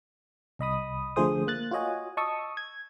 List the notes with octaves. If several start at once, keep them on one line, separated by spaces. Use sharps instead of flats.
C2 D#5 B5 D#6
D3 F3 A3 G#4 C5 D#6
A#3 F#6 A6
F4 F#4 C#5 D#5 G#5
D#5 A5 C#6 D#6 E6
G#6